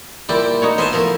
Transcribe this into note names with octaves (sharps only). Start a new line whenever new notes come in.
A#2 G3 E4 D5 G5
D#4 F#4 C#5
B3 E4 C5 G#5 A5
F3 A3 E4 A#4